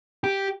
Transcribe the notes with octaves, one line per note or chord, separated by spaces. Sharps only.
G4